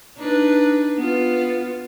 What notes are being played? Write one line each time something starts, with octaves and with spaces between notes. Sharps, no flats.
D4 D#4 B4
B3 F4